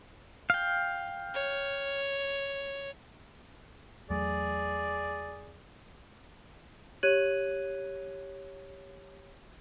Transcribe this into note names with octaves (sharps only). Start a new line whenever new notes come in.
F5 G5
C#5
E2 F#3 A3 G#4 D5
G4 C#5 F#6 G#6 D#7 F#7